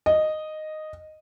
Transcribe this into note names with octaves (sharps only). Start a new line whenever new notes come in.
D#5